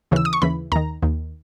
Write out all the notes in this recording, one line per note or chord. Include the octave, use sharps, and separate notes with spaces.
D#2 C#3 E3 E6
D#6
C#6
D#2 C#3 E3 B5
D#2 D#3 A#5
D#2 D#3